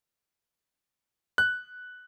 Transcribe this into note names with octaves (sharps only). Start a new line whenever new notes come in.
F#6